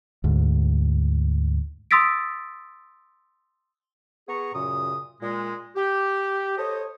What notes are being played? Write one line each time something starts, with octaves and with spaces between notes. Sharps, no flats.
D2 G#2
C6 D#6 E6 A6 B6 D7
B3 G#4 A#5 C#6
F#2 A#2 C#3 D#6
A#2 G#3
G4
A4 C5 C#5 D#5